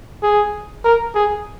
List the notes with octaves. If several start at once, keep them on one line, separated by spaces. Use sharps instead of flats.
G#4
A#4
G#4